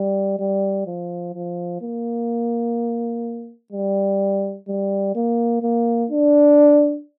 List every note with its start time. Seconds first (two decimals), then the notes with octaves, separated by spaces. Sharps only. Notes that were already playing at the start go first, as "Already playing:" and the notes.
Already playing: G3
0.39 G3
0.87 F3
1.34 F3
1.82 A#3
3.72 G3
4.68 G3
5.15 A#3
5.63 A#3
6.11 D4